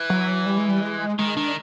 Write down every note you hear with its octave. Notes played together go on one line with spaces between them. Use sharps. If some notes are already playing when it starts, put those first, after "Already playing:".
Already playing: E3
F#3
G3
G#3
G3
G#3
D#3 G#3
D#3 D4